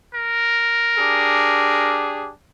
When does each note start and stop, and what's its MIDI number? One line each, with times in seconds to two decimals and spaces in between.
0.14 2.00 70
0.98 2.31 62
0.98 2.31 67
0.98 2.31 68